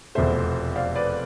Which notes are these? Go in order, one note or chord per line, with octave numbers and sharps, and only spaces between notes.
F1 E2 B2 A3 C5 E5
D5 F5
B4 D5